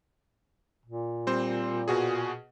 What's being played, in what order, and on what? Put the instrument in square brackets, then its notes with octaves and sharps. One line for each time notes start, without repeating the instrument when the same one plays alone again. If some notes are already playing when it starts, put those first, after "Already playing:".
[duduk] A#2
[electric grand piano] G3 C4 C5
B2 F#4 G#4